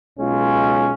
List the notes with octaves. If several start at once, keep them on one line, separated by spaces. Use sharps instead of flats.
B1 G#3 C#4 F4